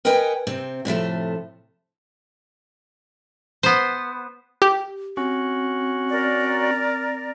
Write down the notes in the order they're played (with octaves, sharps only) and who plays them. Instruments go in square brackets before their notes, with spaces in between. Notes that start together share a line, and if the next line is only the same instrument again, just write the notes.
[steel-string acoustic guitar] A#4 B4 C#5 D#5 G5 G#5
C3 C4
A2 C3 F3 A3
[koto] B3 C5
[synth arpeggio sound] G4
[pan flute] C4 [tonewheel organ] C#4 F#4
[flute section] A#4 D5